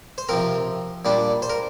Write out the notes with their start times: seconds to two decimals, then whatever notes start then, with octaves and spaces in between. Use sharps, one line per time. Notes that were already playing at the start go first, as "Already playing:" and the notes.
0.18 C5
0.29 C3 F3 C4 A#4
1.05 A#2 G3 D4
1.42 C5
1.50 A#4